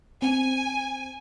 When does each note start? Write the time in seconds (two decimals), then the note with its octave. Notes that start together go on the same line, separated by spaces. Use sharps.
0.22 C4 G#5